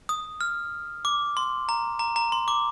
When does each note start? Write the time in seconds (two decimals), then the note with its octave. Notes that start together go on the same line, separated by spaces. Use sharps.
0.09 D#6
0.41 F6
1.05 D6
1.37 C6
1.69 A#5
1.99 A#5
2.16 A#5
2.32 C6
2.48 D6